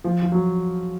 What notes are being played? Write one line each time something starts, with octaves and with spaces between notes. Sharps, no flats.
F3
F3
F#3